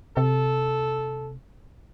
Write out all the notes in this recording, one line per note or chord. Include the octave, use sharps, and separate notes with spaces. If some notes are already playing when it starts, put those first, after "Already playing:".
C3 A4